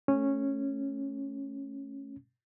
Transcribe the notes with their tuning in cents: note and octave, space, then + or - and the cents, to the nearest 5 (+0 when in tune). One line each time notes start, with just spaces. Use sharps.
A3 +0 C#4 -10